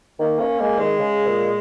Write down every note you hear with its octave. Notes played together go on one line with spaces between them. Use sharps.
D#3 A#3
A#3 C#4
G#3 A#3
D#3 G#3
C#3
A#2